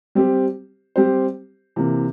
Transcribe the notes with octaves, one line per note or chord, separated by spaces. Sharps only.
G3 C4 G4 C5
G3 C4 G4 C5
C3 E3 A#3